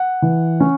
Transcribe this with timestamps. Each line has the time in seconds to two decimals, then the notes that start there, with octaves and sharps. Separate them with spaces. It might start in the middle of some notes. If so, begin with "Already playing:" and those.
Already playing: F#5
0.22 E3
0.60 C#4